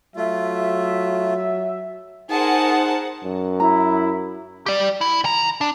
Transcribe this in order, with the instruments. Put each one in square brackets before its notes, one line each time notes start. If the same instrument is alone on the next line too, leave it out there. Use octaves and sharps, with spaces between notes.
[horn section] F#3 E5 [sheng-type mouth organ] A3 F4
[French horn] D#4 [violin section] G#4 A#4 C5 [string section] F#5 [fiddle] A5
[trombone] F#2
[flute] E4 [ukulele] A#5
[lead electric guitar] G4 D5
E4
D#3 A#5
D4